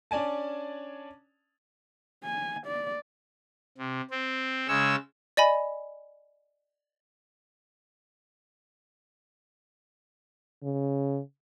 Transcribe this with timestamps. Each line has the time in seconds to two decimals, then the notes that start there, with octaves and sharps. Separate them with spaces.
0.11 C#4 D4 D5 G#5 A5
2.24 G#5
2.67 D5
3.78 C3
4.11 C4
4.68 C#3 G#3 C#5 E6
5.37 D5 D#5 G#5 B5
10.63 C#3